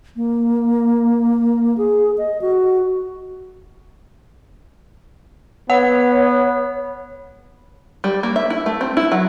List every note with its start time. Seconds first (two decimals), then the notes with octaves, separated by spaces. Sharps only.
0.16 A#3
1.78 G#4
2.18 D#5
2.41 F#4
5.70 B3 C#5 F#5
8.04 G3
8.23 A#3
8.36 E5
8.50 E4
8.66 A3
8.81 C4
8.97 E4
9.12 F#3